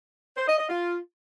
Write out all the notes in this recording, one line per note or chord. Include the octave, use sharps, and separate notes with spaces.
C5
D#5
D#5
F4